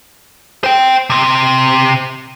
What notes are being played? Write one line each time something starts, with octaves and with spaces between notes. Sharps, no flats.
C5 G5
C3 C4